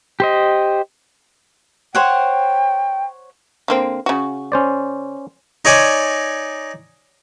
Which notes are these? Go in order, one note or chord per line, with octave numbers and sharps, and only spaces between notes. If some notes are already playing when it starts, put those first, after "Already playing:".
G4 C5 D#5
C5 C#5 F#5 G5
D3 A#3 C4
C#3 F#4
C#4 C5 D5
D#4 C#5 D5 G#5